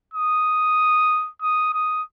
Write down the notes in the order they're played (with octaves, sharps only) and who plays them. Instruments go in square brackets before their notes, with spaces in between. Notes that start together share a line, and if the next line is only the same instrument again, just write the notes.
[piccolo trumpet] D#6
D#6
D#6